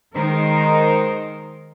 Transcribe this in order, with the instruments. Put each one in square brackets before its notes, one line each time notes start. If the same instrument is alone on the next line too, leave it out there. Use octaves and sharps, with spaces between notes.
[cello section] D#3 G#3 D#4 A#4 C5